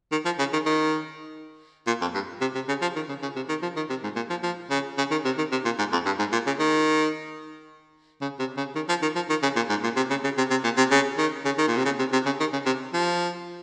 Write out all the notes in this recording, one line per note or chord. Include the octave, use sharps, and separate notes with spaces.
D#3
F3
C#3
D#3
D#3
A#2
F2
G2
C3
C3
C#3
F3
D#3
C#3
C#3
C3
D#3
F3
D#3
C3
G#2
A#2
F3
F3
C#3
C#3
D#3
C3
D#3
C3
A#2
G#2
F2
G2
G#2
A#2
C#3
D#3
C#3
C3
C#3
D#3
F3
D#3
F3
D#3
C#3
A#2
G#2
A#2
C3
C#3
C#3
C3
C3
A#2
C3
C#3
D#3
C#3
D#3
A#2
C3
C#3
C3
C3
C#3
D#3
C#3
C3
F3